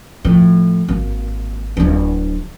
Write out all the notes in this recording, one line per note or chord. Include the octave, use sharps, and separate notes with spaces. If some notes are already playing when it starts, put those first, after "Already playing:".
A2 F3
G#1 A#3
D1 D4